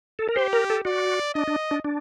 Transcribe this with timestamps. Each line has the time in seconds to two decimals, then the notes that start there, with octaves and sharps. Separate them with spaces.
0.19 A4
0.29 A#4
0.36 G4 C5
0.53 A#4
0.70 A4
0.85 F#4 D5
1.34 D4 D#5
1.47 D4
1.71 D4
1.84 D4